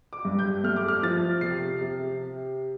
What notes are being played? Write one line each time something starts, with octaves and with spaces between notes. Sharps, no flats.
D6
G2
G6
A3 F6
D6
F6
F3 A6
C3 C7
C3